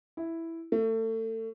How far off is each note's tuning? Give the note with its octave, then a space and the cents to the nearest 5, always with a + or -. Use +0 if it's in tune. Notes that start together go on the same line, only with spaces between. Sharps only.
E4 +0
A3 +30